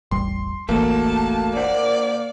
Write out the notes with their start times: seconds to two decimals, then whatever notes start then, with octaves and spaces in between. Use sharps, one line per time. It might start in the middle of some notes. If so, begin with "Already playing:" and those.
0.11 E1 A1 G3 C6
0.69 E1 A1 E2 A3 A#3 F#4 A4 A5
1.56 A#2 C5 D5 F#5